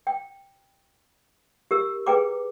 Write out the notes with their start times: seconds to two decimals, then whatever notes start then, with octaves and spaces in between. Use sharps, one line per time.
0.07 G5
1.71 G4 A#4 E6
2.06 G#4 B4 G5 A#5 D6